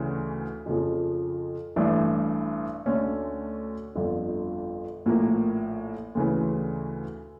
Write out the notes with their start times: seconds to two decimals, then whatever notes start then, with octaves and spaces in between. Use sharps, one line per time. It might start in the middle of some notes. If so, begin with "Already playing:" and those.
Already playing: D2 C#3 E3
0.66 F2 C#3 F3
1.76 A1 G2 E3 A3 D4
2.86 D2 D3 A3 C#4
3.96 G1 F2 D3
5.06 A#1 A2 F3 A#3
6.15 D2 C#3 E3